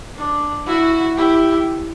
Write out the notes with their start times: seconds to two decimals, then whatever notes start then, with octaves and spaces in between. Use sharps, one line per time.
0.16 D4
0.66 E4 F#4
1.17 E4 G4